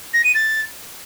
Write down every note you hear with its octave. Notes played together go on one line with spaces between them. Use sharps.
A#6
D#7
A6